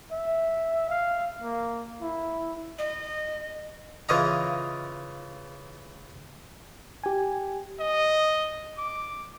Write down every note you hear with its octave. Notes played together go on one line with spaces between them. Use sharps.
E5
F5
A#3
E4
D#5
C#3 E3 F4 D#5 E5 A#5
G4 G#5
D#5
D6